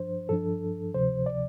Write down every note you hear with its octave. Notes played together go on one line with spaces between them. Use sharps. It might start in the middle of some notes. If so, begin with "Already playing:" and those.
Already playing: G2 F3 D4 C5
G2 F3 D4 A4
D2 C3 F3 C5
D5